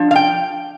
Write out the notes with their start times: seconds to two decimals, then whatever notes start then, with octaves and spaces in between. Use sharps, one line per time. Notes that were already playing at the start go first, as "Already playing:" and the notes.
Already playing: F3 D4
0.11 F5
0.16 G5